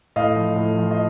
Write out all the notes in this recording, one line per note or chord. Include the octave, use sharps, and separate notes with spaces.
A2 D#5 F5
F3
A2
F3
D#5